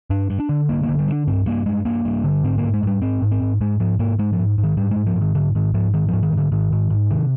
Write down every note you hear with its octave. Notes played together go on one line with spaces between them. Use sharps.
G2 D4
G2
D4
D3
G2 A#3
A#3
D3
G3
G2
D4
G2 C4
G2 A#3
G2 G#3
G2 A#3
G2
D3
G#2 C4
A#3
G#2
G#3
G#2 G3
G#2 C4
G#2
C4
G#2
G#2 G#3
G#2 F3
G#2 A#3
G#2 G#3
F3
G#2
G#2
D#3
G#2 G3
G#2 G#3
F3
G#2
D#3
G#2 D3
G#2 D#3
G#2 F3
G#2 D#3
G#2 F3
D#3
G#2
D3
G#2 D#3
G#2
G#2
C3 D#3